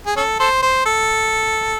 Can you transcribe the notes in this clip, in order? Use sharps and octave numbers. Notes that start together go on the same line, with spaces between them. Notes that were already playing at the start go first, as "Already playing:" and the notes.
G#4
C#4 A4
A4 C5
C5
A4